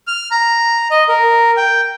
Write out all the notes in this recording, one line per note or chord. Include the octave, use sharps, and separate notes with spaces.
F6
A#5
D#5
A#4
G5